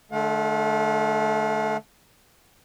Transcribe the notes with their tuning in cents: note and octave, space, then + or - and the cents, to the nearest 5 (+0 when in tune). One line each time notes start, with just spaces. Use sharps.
D3 +25 A3 -25 F5 +45